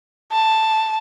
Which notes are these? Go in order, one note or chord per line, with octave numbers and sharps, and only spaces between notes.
A5